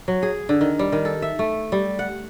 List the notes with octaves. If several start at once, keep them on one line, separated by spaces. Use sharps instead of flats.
F#3
G#4
D3
D#3
G3
D#3
A4
E5
A3
G3
F#5